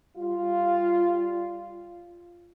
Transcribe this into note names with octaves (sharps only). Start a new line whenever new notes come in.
G3 F4